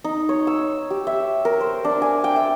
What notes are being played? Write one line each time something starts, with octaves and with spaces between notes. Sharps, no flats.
D#4
C#5
E6
G4
E5
A#4
C5
D4
G#5
G5
E5